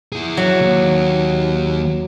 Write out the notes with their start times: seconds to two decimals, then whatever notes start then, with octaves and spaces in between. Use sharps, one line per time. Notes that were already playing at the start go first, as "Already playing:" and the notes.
0.12 E4 G#4
0.37 F#3
0.61 D#2